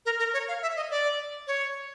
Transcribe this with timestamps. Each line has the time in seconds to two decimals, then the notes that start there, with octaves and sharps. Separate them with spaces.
0.06 A#4
0.19 A#4
0.34 C#5
0.48 F5
0.62 E5
0.76 D#5
0.91 D5
1.47 C#5